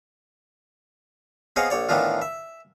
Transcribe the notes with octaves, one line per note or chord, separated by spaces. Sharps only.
B3 C4 G#4 C#5 D#5 F5
A#1 C#5 D5
A2 D#3 E3 B3 D4 F4
E5